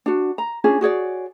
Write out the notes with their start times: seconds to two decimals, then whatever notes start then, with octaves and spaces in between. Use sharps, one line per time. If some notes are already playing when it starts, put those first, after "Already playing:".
0.06 D4 F#4
0.38 A#5
0.64 C#4 D4 F4 G#4
0.81 F#4 G#4 C#5 D5